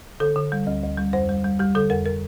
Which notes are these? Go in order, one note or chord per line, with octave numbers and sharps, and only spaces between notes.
D3 A4
D3
G3
D2
D2
G3
F2 C5
G3
G3
G3 G4
D3 A4
F2 A#4
A#4